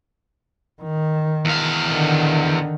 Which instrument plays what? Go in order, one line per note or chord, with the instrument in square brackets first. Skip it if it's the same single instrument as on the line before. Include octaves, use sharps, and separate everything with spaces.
[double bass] D#3
[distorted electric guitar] E2 F5
[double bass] D3 D#3